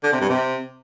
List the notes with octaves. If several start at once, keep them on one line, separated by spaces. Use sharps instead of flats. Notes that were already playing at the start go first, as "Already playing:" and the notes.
D3
C3
G2
C3